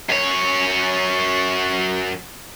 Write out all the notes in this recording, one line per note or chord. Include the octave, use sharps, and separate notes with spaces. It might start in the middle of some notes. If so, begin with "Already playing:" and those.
F#2 C#5